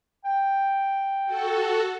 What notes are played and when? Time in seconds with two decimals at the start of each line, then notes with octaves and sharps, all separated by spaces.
0.25 G5
1.25 F#4 A4